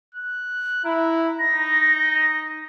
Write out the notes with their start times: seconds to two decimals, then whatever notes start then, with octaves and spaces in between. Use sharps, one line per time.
0.15 F#6
0.85 E4 A#5
1.39 D#4 A#6